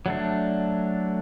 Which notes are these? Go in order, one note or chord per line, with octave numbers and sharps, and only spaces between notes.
F#3 A3 D4